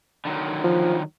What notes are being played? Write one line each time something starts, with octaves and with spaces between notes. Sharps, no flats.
D3 D#3 F#3
F3